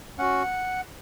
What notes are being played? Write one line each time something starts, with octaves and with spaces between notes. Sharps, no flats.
C#4 F#4 F#5